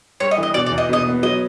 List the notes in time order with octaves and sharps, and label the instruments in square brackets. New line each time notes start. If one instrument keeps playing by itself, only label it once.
[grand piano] G3 [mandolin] C#5
[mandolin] D#5
[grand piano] E3
[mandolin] D#5
[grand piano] B2 [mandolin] D5
[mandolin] D5
[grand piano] E2
[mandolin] D#5
[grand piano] B2 [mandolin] D#5
[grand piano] B3
[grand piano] F#3 [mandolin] D#5